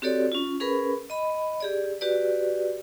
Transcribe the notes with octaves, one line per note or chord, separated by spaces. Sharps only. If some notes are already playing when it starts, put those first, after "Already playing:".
C4 F#4 G4 A4 C#5 D5
C#4 F4
C#4 G#4 A#4 B4 B5
D#5 B5
G4 G#4 D5
F#4 G4 B4 D5